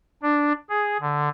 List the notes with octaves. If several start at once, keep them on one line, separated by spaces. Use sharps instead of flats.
D4
G#4
D3